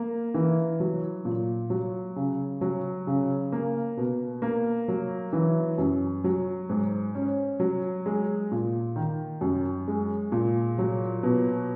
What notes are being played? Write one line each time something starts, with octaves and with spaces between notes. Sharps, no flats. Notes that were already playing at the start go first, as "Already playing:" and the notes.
Already playing: A#3
E3
F#3
A#2
F#3
C#3
F#3
C#3
A#3
B2
A#3
F#3
E3
F#2
F#3
G#2
C#4
F#3
G#3
A#2
D#3
F#2
G#3
A#2
F#3
B2